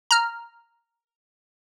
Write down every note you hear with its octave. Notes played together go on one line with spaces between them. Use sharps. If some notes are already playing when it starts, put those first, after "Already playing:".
A#5 F6